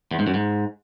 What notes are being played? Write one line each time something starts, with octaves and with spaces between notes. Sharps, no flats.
E2
G#2
F#2
G#2